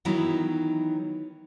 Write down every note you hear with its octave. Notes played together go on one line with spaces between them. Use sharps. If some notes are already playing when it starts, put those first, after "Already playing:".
D#3 E3 F#3 B3 D#4 E4